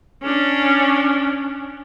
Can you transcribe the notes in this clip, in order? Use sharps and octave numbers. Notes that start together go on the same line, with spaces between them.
C#4 D4